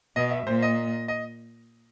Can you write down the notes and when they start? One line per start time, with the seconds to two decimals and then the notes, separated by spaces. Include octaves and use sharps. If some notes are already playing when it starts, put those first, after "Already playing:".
0.16 B2 D#5
0.31 E5
0.46 A#2 C5
0.62 D#5
1.08 D#5